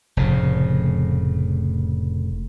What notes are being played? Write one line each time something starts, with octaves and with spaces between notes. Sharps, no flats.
F1 A2 C#3